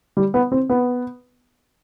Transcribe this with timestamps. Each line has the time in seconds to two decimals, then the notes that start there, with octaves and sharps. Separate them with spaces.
0.17 G3
0.34 B3
0.52 C4
0.70 B3